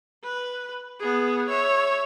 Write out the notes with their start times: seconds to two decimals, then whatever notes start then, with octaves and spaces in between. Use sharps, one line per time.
0.24 B4
0.99 B3 G#4
1.49 C#5 E5